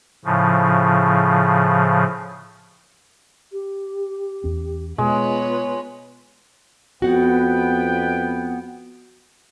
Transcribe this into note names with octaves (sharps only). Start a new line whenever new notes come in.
A2 C#3 F3
G4
E2 C#4
B2 G#3 B3 F4 B4 C#5
F2 B3 F#4 B4 F#5 G5